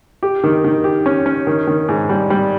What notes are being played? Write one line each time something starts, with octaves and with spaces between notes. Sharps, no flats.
G4
D#3
D#3
G4
C#4
C#4
D#3
D#3
G#2
G3
G3